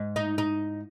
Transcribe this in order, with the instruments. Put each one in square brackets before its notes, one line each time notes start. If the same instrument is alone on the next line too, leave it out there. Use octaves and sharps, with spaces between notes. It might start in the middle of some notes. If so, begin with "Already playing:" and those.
Already playing: [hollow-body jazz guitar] G#2
[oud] D#4
D#4